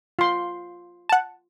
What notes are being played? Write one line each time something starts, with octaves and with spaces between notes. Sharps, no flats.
F4 C6
F#5 A5